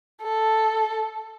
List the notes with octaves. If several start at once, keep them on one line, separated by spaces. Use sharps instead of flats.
A4